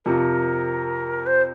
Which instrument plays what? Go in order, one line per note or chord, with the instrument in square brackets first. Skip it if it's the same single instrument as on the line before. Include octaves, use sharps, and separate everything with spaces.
[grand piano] F2 C3 F3 [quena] A#4
[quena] C5